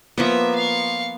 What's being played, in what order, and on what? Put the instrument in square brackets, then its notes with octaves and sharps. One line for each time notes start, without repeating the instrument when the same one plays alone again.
[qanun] F3 A#3 B3 [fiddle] E5
[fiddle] F5 C#6